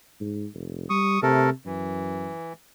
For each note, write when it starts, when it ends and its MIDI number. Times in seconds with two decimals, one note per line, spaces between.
0.20 0.46 44
0.54 0.88 29
0.90 1.18 55
0.90 1.20 85
0.90 1.20 87
1.23 1.49 48
1.23 1.50 57
1.23 1.50 69
1.23 1.50 70
1.66 2.31 42
1.66 2.53 52